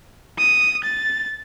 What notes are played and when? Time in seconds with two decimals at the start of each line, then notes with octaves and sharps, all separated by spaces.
0.38 D#6
0.84 A6